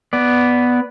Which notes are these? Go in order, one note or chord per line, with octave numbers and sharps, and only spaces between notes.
B3 D5